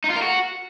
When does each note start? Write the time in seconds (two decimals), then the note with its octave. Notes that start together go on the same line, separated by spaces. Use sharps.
0.04 D#4
0.10 F4
0.16 A#4
0.22 F#4